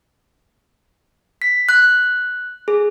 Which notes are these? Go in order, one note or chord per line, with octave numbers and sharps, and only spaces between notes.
B6
F#6
G#4